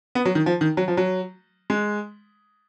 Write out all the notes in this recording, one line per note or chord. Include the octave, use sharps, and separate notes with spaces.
B3
F#3
D#3
F3
D#3
F#3
F3
F#3
G#3